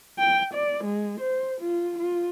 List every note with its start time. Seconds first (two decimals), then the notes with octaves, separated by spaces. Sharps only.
0.19 G5
0.54 D5
0.84 G#3
1.21 C5
1.61 F4
1.98 F4